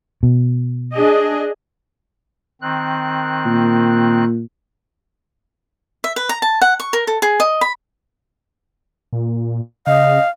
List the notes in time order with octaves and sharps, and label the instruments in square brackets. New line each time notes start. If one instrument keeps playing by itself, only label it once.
[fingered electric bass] B2
[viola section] D4 G#4 D#5
[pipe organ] D#3 C4 F#6
[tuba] A#2
[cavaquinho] E5
B4
A#5
A5
F#5
C#6
A#4
A4
G#4
D#5
B5
[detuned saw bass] A#2
[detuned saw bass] C#3 [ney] D#5 [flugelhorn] F5